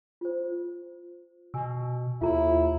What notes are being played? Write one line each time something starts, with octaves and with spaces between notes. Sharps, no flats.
F4 C5
B2 G#5 E6
D#2 E4 F4 A4 A#5